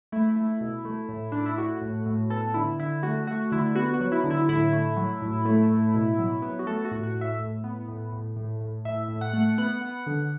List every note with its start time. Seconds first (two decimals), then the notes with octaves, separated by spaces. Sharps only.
0.12 A3 E4
0.36 A3
0.61 B2
0.85 A3
1.09 A2
1.32 A2 D4
1.46 E4
1.58 A3 F#4
1.81 A2
2.06 A2
2.30 B3 A4
2.54 D3 E4
2.79 D3 E4
3.03 A3 F#4
3.27 A3 F#4
3.52 D3 E4
3.75 B3 F#4
3.93 F#4
4.00 F#3
4.12 E4
4.24 D3
4.30 E4
4.49 A2 E4
4.73 A3
4.96 F#3
5.22 A2
5.45 A3
5.70 A2
5.94 B2
6.18 F#3
6.42 B3
6.59 F#4
6.66 A3 A4
6.85 F#4
6.92 A2
7.03 F#4
7.15 A2
7.21 E5
7.40 A2
7.64 B3
7.88 A2
8.13 A2
8.36 A2
8.61 A2
8.85 A2 E5
9.09 A2
9.21 F#5
9.33 A3
9.58 B3 F#5
9.81 B3
10.07 D3